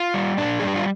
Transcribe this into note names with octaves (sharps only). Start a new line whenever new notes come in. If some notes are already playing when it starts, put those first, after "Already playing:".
Already playing: F4
G3
A#2 D4
G3 G#4
G4
F4